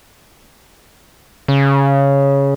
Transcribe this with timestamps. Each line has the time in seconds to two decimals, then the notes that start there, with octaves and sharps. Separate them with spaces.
1.48 C#3